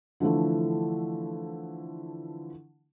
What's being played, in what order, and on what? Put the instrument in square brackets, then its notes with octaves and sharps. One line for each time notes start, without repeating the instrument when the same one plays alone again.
[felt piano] D3 E3 F3 A3 E4